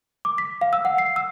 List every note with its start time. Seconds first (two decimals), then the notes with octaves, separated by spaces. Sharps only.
0.25 D6
0.38 B6
0.61 F5
0.73 E6
0.85 F#5
0.98 C7
1.16 E6